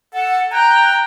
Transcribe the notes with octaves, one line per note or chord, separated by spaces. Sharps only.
A4 F#5
G5 A#5 F#6